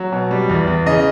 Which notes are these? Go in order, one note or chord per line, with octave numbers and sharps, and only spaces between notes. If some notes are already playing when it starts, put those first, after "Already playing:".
Already playing: F#3
B2
G3
E2
E2
C#3 D#5